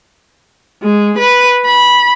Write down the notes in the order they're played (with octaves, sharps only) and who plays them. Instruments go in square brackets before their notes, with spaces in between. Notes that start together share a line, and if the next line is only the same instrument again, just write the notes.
[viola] G#3
B4
B5